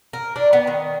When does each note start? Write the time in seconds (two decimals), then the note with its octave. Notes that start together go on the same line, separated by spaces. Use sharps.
0.13 A#4
0.36 D4
0.53 B3
0.67 D#3